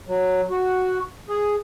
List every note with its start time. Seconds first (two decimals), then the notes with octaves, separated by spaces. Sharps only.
0.08 F#3
0.51 F#4
1.29 G#4